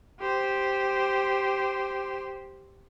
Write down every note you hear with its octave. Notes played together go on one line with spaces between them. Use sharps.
G4 C5